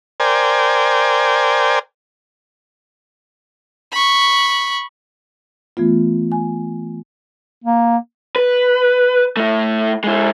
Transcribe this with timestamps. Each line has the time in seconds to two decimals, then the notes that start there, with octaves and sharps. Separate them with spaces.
0.20 A#4 C5 D5 G5 G#5
3.92 B5 C#6
5.77 E3 A3 B3 F4
6.32 G#5
7.64 A#3
8.36 B4
9.37 A3 E4
10.04 G#3 E4